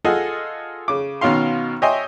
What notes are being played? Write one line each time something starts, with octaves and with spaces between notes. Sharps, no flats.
F4 G#4 A4 D#5 F#5
C#3 D6
B2 D#3 C#4 F5 C6
C#5 D#5 E5 G5 G#5 C6